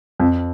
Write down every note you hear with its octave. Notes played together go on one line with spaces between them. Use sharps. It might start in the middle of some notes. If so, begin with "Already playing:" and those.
F2